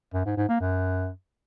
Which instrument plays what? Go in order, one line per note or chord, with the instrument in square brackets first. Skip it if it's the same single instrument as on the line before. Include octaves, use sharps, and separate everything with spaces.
[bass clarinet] F#2
G#2
G#2
A#3
F#2